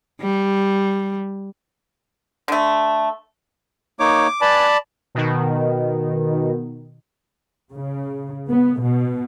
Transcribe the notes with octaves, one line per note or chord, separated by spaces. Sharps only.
G3
D3 A3
A#3 D#4 C#5 D6
B4 D5 G#5 A5 B5
B2 D#3
C#3
B3
B2